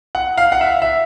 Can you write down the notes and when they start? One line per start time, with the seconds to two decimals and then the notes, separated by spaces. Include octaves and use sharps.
0.15 F#5
0.37 F5
0.52 F#5
0.61 E5
0.67 F5
0.82 E5